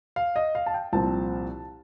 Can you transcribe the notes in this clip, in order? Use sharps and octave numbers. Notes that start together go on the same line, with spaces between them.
F5
D#5
F5
A5
G5
C2 A#2 F3 C4 A5